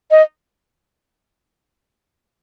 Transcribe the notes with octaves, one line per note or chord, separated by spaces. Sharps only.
D#5